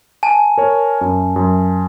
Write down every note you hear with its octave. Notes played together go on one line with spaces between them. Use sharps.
G#5 A5
A#4 C#5
F#2
F#2